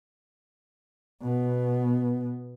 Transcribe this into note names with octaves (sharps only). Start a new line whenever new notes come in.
B2 B3